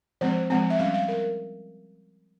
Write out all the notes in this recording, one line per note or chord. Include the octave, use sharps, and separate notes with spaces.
F3 G#3 C4 C5
F3 G#3 C4 G#5
E5
G3 C#4 F5
F5
A#4